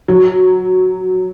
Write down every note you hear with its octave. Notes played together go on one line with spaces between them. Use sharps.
F#3